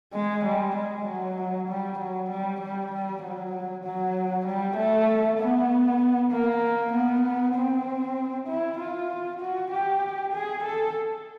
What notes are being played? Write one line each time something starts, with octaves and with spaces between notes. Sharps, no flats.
G#3
G3
G#3
F#3
G3
F#3
G3
G3
G3
F#3
F#3
G3
A3
B3
A#3
B3
C4
E4
F4
F#4
G4
G#4
A4